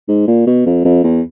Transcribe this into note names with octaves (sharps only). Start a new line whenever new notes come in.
G#2
A#2
B2
F2
F2
E2